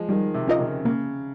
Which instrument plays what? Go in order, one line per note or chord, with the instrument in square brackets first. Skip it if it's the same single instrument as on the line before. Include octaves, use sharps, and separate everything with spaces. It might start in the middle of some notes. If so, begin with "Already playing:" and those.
Already playing: [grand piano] F3 G#3
[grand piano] D#3 [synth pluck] G3
[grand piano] C3
[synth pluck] C#4 F4 A#4 D#5
[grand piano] C#3
[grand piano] C#3 [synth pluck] A#3